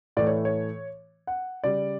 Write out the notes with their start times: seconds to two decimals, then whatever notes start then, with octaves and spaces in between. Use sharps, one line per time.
0.17 A2 E3 A3 D5
0.27 C#5
0.45 C#5
1.27 F#5
1.64 C#3 G3 D5